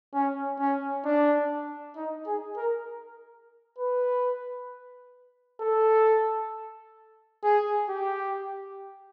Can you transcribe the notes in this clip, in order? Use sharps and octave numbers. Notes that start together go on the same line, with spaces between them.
C#4
C#4
D4
D#4
G#4
A#4
B4
A4
G#4
G4